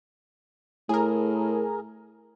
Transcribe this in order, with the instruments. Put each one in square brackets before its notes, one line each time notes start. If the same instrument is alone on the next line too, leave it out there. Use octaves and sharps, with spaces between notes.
[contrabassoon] A2 [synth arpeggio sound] G#4 A#4